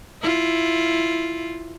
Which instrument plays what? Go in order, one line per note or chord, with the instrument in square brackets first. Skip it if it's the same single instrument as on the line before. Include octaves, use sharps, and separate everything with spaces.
[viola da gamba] E4 F4